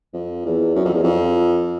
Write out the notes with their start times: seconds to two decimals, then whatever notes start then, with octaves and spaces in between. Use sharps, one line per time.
0.13 F2
0.45 E2
0.75 F#2
0.85 F2
0.94 E2
1.03 F2